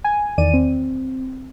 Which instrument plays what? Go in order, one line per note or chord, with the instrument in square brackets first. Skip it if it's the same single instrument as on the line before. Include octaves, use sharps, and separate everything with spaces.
[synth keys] G#5
E2 D#3 D5 D#7
C4